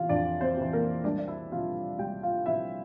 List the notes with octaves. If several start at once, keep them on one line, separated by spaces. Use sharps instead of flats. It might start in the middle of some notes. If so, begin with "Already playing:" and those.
Already playing: C3 E3 F4 F5
F2 D4 D5
C4 C5
C3 E3
A#3 A#4
C2 D4 D5
D5
E4 E5
C3 F3 F4 F5
C2 G4 G5
F4 F5
C3 F3 E4 E5